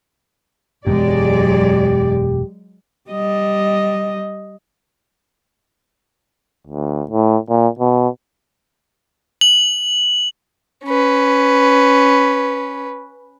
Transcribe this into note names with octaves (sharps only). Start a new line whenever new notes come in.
E1 F#2 F#3 G#3 G4 D5
G3 D#5
D2
A2
A#2
B2
F#7
C#4 B4